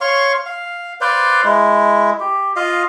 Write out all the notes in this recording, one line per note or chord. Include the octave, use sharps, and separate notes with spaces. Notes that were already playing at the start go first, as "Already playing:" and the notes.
C#5 F5 C6 C#6
F5
B4 C5 D5 F5
G#3 E4
G4
F4 D#5 F5